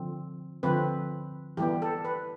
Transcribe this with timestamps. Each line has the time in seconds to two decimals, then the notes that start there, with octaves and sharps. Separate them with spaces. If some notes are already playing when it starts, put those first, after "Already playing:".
Already playing: D3 F3 C4
0.63 D3 F3 C4 B4
1.57 E3 G3 B3 G4
1.82 A4
2.05 B4